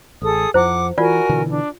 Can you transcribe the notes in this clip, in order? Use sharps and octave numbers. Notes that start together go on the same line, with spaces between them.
A1 G#4 A4 D#6
F2 F3 E4 C5 F#5 D6
E3 F4 F#4 A#4 D5 F#5 G#5
B2 D3 E3
D4